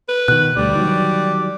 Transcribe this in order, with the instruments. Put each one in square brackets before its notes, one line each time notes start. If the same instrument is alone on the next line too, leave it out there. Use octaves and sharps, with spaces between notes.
[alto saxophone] B4
[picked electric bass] B2 D#3 [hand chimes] F#6
[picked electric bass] D2 [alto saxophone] G3 [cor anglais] D5
[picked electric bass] D#3 F#3